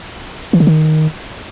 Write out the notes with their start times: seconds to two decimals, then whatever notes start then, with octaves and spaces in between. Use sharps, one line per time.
0.53 E3
0.60 D3
0.67 D#3